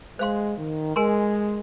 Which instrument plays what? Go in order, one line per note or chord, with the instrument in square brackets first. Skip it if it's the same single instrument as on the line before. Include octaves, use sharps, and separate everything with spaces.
[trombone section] G#3 [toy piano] C5 F5 C6
[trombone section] D#3
[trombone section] G#3 [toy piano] A#4 G#5 C6